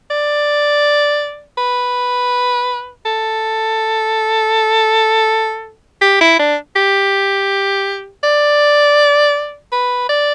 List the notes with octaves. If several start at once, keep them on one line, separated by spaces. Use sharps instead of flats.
D5
B4
A4
G4
E4
D4
G4
D5
B4
D5